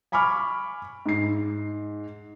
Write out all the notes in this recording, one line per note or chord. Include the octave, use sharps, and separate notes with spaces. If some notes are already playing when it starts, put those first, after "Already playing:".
G#5 B5 C#6 D6 F6
G#2 C7